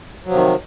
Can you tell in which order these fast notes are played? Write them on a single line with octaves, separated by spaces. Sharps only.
F#3 F3 C3 D#3